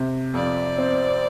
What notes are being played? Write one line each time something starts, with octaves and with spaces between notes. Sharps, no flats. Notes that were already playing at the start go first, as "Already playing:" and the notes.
Already playing: C3
F2 D5
C4